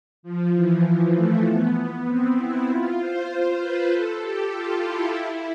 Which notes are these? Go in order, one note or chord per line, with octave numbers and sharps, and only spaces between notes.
F3
E3
F3
A3
B3
C4
E4
F4
C5
C5
B4
A4
G4
F4
E4
E4